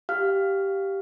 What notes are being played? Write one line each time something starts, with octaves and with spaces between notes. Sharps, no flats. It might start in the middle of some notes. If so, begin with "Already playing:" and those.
G4 F5 F6